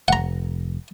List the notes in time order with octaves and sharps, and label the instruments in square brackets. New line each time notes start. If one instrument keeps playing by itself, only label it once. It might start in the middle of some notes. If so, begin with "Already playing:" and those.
[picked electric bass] F1 [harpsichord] F#5 A#5